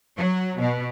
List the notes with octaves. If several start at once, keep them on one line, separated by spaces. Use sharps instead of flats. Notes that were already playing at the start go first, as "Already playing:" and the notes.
F#3
B2